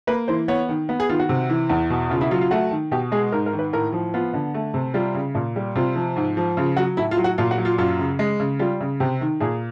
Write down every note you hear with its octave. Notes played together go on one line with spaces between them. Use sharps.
A#3 B4
E3 C5
B3 C#5
D#3
B3
G#4
D#3 F4
F#4
C3
E3
E2
B2
C#3 F4
E4
F#3 F4
F4
A3 F#4
D#3
B2 G4
G#3 G#4
G#2 A#4
A#4
D#3
B4
A2 A#4
F3
B3 F4
D3
A3
C3
G3 F4
C#3
A#2
G3
C3 F4
F3
G#2
F3
C#3 F4
F#3 F#4
A2 E4
F4
F#3
F#4
A#2 F4
F#4
F#3
F4
F#2 F4
C#3
G#3
C#3
G3 F4
C#3
C3 G4
D#3
A#2 G#4